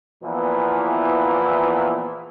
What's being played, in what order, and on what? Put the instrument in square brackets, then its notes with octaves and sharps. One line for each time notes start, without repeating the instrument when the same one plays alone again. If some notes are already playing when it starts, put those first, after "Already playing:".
[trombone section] E2 A#2 E3 F3 B3 E4